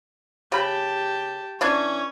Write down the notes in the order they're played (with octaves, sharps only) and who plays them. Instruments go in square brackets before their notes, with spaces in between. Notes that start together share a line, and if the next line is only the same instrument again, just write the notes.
[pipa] C#3 B5 [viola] G4 A5
[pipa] E3 D4 G#5 [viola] C#4 C#5